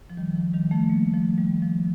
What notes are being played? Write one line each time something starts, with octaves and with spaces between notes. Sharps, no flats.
F3
D#3 G3
F3
D#3 G3
F3 A3
G3 A#3
F3 A3
D#3 G3
F3